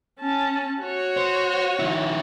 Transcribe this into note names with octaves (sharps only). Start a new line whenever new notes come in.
C#4 A5
F#4 C#5
C5
D#3 E4